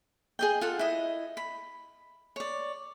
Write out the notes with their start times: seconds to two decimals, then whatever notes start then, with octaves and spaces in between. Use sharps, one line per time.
0.39 G#4 D#5 G5
0.61 F4 A4 F#5
0.79 E4 D#5
1.37 B5
2.36 C#5 D5